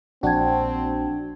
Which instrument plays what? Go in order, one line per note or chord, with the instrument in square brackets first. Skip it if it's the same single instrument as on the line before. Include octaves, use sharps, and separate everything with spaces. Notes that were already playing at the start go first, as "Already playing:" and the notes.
[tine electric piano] A#1 [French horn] C4 [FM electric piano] D4 F#4 [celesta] G5 A5 G#6